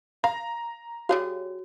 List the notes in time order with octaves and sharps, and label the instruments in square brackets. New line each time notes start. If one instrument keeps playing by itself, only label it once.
[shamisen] F5 [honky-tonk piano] A#5
[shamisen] G3 G#4 F5 [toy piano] F#4 C#5